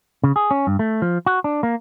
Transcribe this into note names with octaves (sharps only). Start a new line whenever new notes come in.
C#3
G#4
C#4
G2
A3
F3
F#4
D4
A#3